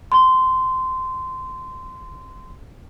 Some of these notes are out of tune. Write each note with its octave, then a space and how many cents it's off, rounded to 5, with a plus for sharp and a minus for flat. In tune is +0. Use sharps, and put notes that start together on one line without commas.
C6 -20